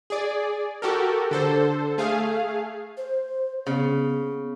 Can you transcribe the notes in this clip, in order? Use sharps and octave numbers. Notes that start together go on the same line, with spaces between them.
G#4 D5
F#4 G4 A4 A#4
D3 A4 C5
A3 G#4 F5
C5
C#3 B3